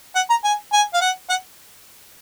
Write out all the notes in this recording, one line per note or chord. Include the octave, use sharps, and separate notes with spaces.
F#5
A#5
G#5
G#5
F5
F#5
F#5